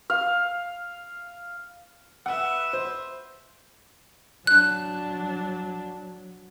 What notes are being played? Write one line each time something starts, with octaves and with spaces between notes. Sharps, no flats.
F5
B4 E5 F#5
C5
F#3 D4 F#6